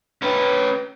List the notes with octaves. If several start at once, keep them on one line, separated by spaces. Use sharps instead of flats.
C#4 B4